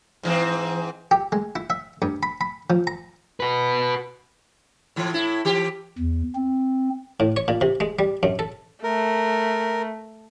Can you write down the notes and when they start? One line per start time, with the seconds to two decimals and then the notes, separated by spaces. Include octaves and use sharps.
0.23 G#2 E3 C4
1.11 G4
1.32 G#3
1.56 E4
1.70 E5
2.02 G2
2.23 B5
2.41 B5
2.70 F3
2.87 A#5
3.40 F#4 B4
4.96 A2 E3
5.13 A2 E4
5.45 E3 G4
5.98 E2
6.35 C4
7.20 A2
7.37 C#5
7.48 A#2
7.61 C3
7.80 G#3
7.99 G3
8.23 F#2
8.39 A4
8.83 A3 A#4